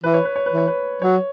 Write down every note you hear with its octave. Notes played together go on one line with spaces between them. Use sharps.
E3 B4
C#5
B4
C#5
B4
E3
C#5
B4
F#3 C#5